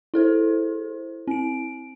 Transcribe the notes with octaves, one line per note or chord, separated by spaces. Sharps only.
E4 A4 C5
C4 D7